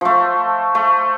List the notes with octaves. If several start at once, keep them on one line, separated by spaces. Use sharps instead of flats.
F3 A3
A3